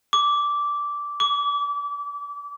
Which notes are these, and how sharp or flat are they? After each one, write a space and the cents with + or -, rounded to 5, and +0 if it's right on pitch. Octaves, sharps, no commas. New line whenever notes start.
D6 -10
D6 -30